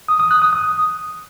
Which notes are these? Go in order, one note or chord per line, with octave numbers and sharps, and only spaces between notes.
D#6
D#6
F#6
D#6
D#6